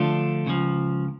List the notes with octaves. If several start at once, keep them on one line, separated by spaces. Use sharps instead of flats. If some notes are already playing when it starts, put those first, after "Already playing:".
Already playing: D3 F3 A3 D4 F4
C#2 C#3 F3